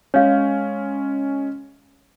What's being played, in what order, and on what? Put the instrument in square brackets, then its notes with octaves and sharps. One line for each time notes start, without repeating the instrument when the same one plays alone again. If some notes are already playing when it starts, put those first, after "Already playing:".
[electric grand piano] G#3 C#4 [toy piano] C#5 F5